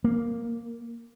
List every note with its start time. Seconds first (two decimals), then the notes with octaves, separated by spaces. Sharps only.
0.04 A#3